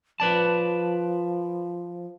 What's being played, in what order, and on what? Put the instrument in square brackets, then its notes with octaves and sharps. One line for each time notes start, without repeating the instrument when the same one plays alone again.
[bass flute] F3 [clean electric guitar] B4 D5 A5